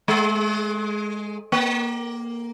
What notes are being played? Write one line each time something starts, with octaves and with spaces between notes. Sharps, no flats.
G#3
A#3